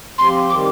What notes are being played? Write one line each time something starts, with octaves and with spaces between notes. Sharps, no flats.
F3 C4 G4 C6
D#3 G3 C4 D6